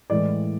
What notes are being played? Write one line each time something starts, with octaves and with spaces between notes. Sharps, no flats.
A2 E3 G#3 D5